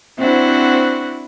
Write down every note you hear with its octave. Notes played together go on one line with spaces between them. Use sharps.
C4 D4 E4 F#4 C5 F#5